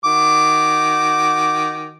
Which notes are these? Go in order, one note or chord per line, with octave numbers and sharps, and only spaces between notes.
D#3 F#4 D6